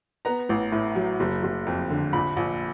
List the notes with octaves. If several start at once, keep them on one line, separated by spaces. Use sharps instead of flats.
B3 A#5
A1
A2
F#3
F#1
F#1
F2
D3
A#1 B5
A#1